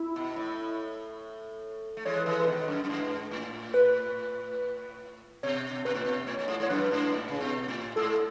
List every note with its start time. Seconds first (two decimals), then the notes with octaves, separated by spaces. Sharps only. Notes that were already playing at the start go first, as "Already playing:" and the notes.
Already playing: E4
0.16 B2
0.36 A2
1.97 A3
2.05 E3 G#3 C#5
2.17 B4
2.26 E3 G#3 A4
2.40 B4
2.47 B2 D#3
2.68 F#2
2.84 F#2
2.89 G#2
3.31 A2
3.74 B4
5.43 B2 C#5
5.85 B2 B4
5.94 A2
6.05 B2
6.27 A2 C#5
6.39 A2
6.48 G#2
6.60 G#2 C#5
6.69 F#2 B4
6.91 G#2
7.12 A2
7.28 C#3
7.41 B2
7.68 A2
7.96 G#2 A4